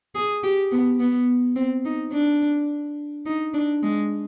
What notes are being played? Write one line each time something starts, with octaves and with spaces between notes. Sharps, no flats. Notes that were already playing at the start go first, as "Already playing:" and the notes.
G#4
G4
B3
B3
C4
D#4
D4
D#4
D4
G#3